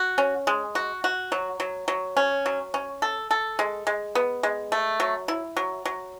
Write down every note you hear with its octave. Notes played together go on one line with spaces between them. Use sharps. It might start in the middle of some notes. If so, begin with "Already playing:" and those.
Already playing: F#4
C#4
G#3
F#4
F#4
F#3
F#3
F#3
C#4
F#3
C#4
A4
A4
G#3
G#3
B3
G#3
A3
F#3
E4
F#3
F#3